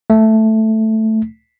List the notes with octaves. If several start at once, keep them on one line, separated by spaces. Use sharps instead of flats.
A3